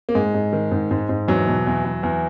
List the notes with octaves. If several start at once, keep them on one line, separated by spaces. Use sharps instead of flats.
A#3
G#2 G#3
G#2
D#3
G#2
G#2
G#2
E2 F#3
B2
E2
E2
E2